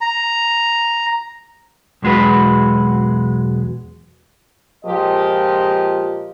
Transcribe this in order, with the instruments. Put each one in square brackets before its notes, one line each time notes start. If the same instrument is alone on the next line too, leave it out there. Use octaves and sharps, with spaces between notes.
[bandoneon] A#5
[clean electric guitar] B1 E2 G#3 F#4 B4
[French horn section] A#2 F3 G#3 G4 D#5